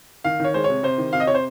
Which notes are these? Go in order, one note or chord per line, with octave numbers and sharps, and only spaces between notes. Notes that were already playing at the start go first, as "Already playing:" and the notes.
D#3 F5
D#3 C#5
G#3 C5
C3 C#5
C3 C5
D#3
C3 F5
D#5
C3 C#5
C5